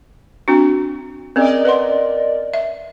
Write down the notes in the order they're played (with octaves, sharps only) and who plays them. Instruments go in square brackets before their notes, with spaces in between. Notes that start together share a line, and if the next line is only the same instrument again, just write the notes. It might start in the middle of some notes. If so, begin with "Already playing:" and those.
[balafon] C4 D4 F#4
[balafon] C4 C#4 G#4 [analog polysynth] A#4 D5 D#5
[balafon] B4 F#5 C6
E5